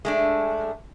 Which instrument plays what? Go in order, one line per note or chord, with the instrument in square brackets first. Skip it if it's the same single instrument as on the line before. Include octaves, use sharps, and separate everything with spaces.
[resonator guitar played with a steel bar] G#3 A3 D4